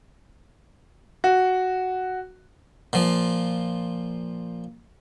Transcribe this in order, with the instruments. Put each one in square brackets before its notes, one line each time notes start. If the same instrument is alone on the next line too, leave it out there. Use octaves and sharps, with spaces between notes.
[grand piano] F#4
[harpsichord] A#2 F3